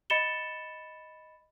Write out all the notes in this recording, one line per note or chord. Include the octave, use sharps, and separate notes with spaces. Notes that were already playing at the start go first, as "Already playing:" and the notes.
D#5 B5 A6 C#7 E7 G7